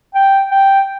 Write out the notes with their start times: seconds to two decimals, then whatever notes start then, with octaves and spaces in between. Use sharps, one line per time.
0.15 G5
0.51 G5